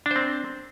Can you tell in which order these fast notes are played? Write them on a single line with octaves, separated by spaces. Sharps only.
D4 C5 C4